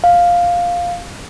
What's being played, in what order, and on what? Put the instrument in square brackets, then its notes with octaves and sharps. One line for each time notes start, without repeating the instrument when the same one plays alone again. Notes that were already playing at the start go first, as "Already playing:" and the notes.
[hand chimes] F5